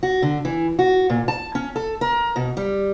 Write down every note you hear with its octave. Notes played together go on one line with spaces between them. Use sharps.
F#4
D3
E3
F#4
A#2
A5
C#4
A4
A#4
B2
G3